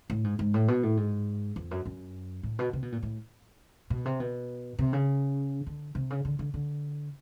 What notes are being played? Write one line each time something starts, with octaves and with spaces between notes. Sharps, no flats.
A2
G#2
G#2
A2
B2
A2
G#2
F2
F#2
F#2
A2
B2
C3
B2
A#2
A2
B2
C3
B2
C3
C#3
D3
C3
C#3
D3
D3
D3